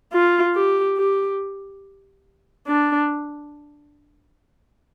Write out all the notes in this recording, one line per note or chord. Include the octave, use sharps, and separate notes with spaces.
F4
G4
G4
D4